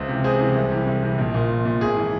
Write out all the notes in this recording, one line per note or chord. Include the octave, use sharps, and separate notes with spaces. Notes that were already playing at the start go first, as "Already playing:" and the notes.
Already playing: C#2 C5 E5
C3 E3
C#2 G#4 C5
C3 E3
C2
C3 E3
C2
C3 E3
A#1
A#2
A#1
A#2
G#1 G#4
E3